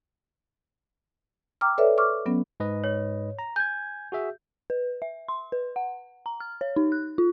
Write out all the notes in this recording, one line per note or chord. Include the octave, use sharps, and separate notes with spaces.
G5 A#5 D6 E6 F6
A4 B4 C#5 D5 E5
C#6 D6 F6
F#3 B3 C#4
G#2 B4 D#5
C#5
A#5
G#5 G6 G#6
F#4 G#4 E5
B4
E5
C6
B4
F#5
A#5
F6
C#5
D#4
F#6
F4